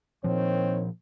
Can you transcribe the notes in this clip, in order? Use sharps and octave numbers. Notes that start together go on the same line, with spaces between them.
A#2 D#3 F3 C4 C#5